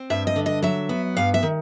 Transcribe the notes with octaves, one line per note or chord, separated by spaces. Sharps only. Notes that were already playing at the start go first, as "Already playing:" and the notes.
Already playing: C4
G2 E5
D#5
D3
D#5
F#3 E5
B3
G2 F5
E5
D#3